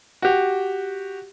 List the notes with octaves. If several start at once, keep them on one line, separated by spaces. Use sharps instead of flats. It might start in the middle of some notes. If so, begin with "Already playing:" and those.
F#4 G4